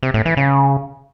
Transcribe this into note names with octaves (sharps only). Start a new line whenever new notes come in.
C3
A2
E3
C#3